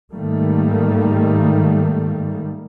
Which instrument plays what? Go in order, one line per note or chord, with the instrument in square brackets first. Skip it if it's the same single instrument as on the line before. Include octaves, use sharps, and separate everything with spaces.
[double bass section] G#2 D#3 G3 A3 A#3